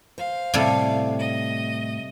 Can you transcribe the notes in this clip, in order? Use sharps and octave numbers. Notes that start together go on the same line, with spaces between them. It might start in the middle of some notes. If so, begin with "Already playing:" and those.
C5 F5
A2 C3 G3 A4
D#5